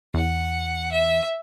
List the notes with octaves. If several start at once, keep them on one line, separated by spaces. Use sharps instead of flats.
E2 F#5
E5